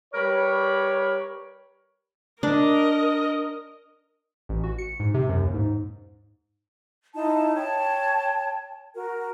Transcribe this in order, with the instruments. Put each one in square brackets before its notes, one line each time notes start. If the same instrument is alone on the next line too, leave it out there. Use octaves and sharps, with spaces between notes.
[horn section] G3 A#4 B4 C#5
[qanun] D4 [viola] A#4 D#5
[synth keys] A1
F#4
C#7
G#2
C3
F#2
D#2
G#2
[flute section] D#4 E4 A5
C#5 G5 A5
F#4 A#4